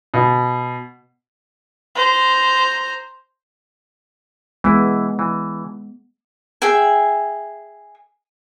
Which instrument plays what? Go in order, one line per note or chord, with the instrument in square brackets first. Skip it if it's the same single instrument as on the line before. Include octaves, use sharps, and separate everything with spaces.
[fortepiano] B2
[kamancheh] C5 A#5
[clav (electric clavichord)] E3 E4 [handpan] G#3 B3
[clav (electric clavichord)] E3
[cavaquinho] G#4 E5 G5 G#5